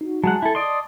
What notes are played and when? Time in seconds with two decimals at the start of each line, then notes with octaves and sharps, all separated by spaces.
0.01 D#4 F#4
0.24 F#3 G#3 F#5 G#5 A5
0.42 E4 A4
0.55 D5 D#5 C6 D#6